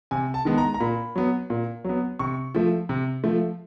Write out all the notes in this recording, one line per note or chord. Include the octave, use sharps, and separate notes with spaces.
C3 G#5
A5
D#3 G#3 B3
A#5
A#5
A#2 B5
F#3 B3
A#2
F#3 B3
C3 C#6
F3 A3
C3
F3 A3